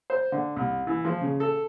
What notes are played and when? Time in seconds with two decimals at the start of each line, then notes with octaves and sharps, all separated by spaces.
0.10 C5
0.32 D3
0.56 C2
0.87 E3
1.05 F3
1.21 C#3
1.40 A4